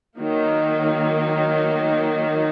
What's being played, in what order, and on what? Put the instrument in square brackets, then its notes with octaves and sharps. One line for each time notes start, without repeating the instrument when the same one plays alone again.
[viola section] D#3 F#3 A#3